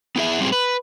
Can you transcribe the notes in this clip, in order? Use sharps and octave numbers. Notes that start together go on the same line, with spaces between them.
B3 E4 G#4 E5
G3 C4 F4 G#4
B4